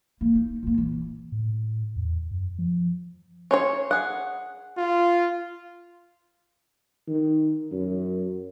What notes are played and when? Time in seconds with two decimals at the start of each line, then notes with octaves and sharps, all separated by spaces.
0.21 A#3
0.35 D#4
0.63 A#2 A#3
0.78 E3
1.32 A2
1.96 E2
2.31 F#2
2.59 F3
3.51 C#4 C5 C#5
3.91 G#4 F#5
4.78 F4
7.08 D#3
7.72 F#2